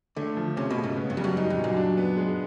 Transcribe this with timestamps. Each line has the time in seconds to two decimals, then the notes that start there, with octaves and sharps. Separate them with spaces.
0.16 D3 A3
0.37 F3
0.57 C3 C#4
0.70 B2
0.77 C#3
0.84 G#2
0.97 B3
1.10 G2
1.17 F2 G3
1.24 F#2
1.36 F#2 D#4
1.50 F2
1.57 A#2
1.64 F#2
1.77 D4
1.97 B3
2.17 G#3